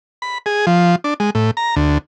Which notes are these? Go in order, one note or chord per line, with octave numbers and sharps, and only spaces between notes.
B5
G#4
F3
D4
G#3
A2
A#5
D2